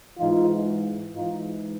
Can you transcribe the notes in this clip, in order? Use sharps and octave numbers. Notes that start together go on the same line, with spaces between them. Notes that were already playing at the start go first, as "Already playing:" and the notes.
G#2 E3 D#4 F4
G#2 E3 D#4 F4